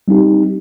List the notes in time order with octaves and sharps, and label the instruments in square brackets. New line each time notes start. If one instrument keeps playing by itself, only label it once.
[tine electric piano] G3 C4 D#4 G4